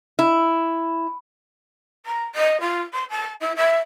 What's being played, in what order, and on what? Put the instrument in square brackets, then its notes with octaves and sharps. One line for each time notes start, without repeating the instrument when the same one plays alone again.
[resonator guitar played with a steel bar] E4
[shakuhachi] A#5
D#5
F4
C6
A5
E4
E5